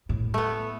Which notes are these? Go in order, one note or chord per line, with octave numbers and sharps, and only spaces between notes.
A2
A3 B3